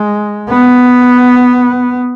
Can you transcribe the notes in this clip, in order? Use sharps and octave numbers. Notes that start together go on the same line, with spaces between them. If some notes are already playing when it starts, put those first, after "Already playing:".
Already playing: G#3
B3